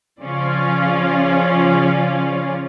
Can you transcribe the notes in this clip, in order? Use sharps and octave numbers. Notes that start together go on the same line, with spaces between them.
C#3 F3 C#4 F4 D5 F5